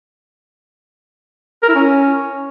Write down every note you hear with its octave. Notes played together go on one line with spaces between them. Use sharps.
A#4
E4
C#4